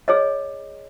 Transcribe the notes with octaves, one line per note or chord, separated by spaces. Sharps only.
G#4 C#5 D#5